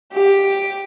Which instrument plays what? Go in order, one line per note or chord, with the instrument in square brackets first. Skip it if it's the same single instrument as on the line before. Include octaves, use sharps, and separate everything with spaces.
[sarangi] G4